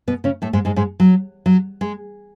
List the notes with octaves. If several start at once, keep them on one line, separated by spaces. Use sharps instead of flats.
B2 B3
C#3 C#4
A2 A3
G#2 G#3
G#2 G#3
G#2 G#3
F#3
F#3
G#3